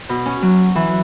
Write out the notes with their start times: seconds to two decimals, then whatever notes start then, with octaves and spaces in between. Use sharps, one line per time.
0.09 B2
0.25 C#4
0.42 F#3
0.75 E3